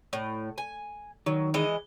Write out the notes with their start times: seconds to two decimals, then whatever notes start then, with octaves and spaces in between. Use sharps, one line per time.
0.13 A2
0.58 G#5
1.26 D#3 F#3
1.54 E3 G#3 D#5